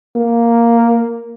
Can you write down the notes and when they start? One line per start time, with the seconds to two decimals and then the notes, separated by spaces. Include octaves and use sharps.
0.16 A#3